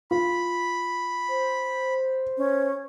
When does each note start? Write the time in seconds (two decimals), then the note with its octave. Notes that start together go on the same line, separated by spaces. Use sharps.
0.11 F4 B5
1.28 C5
2.38 C#4